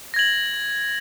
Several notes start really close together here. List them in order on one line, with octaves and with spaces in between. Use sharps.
A#6 G#6 F#7